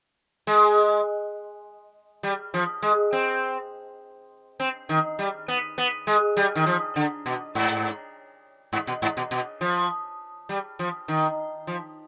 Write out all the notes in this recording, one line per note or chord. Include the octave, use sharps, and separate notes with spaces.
G#3
G3
F3
G#3
C4
C4
D#3
G3
B3
B3
G#3
G3
D#3
F3
D3
B2
G#2
G#2
B2
G#2
B2
B2
F3
G3
F3
D#3
F3